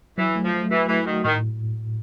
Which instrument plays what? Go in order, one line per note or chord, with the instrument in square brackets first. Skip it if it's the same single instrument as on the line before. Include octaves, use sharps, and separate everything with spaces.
[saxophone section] E3 [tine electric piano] F#3
[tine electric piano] A3
[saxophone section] F3
[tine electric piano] A3
[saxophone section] E3 [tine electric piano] F#4
[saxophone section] E3 [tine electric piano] A3
[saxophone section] D#3 [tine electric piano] F#4
[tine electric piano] A2 [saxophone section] D#3